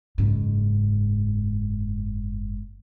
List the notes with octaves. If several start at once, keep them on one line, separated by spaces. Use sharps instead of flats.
F#1 G#2